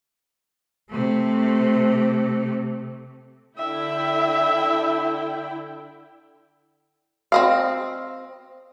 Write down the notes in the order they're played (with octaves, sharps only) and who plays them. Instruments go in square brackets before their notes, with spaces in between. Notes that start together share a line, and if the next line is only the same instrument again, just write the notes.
[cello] C3 A3
[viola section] D3 E4 G5 [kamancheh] E5
[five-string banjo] C4 D#5 F5